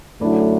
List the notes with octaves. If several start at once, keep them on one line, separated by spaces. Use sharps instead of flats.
F#2 D3 F#3 A3 D4 E4